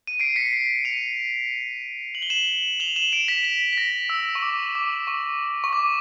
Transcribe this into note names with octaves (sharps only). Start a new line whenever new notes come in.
D#7
C7 D7
B6 C#7
C7
D#7 F7
F#7
G7
E7 F#7
F7 G7
E7 F#7
D7 E7
B6
B6
B6
A#6
E6
C#6
D6
D6
C#6
C#6
D6